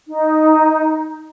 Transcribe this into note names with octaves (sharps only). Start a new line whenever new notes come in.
D#4